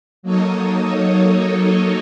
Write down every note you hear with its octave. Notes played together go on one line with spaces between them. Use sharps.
F#3 A#3 D#4 A4 C#5 D#5